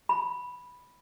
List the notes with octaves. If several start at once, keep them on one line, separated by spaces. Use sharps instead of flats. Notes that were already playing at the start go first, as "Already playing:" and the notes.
B5